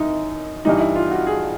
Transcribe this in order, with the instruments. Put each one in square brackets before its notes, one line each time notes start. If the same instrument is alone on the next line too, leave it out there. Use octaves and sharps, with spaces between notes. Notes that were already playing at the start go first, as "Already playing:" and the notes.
Already playing: [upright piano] F#2 D#3 D#4 E4
G2 E3 G3 D#4
E4
F4
F#4
G#4